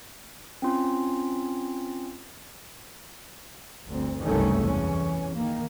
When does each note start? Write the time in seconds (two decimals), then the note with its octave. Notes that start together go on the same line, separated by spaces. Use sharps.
0.62 C4 C#4 F4
3.87 G1 D2 C4
4.23 F#1 C2 G2 D#3 A3 C#4
4.63 E2 E3 C#4
5.36 D#3 A#3